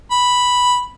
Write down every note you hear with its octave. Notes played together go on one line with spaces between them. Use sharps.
B5